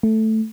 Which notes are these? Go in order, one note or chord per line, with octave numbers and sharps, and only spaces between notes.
A3